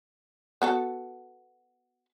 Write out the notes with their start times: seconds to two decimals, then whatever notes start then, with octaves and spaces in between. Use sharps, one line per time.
0.62 B3 F#4 A4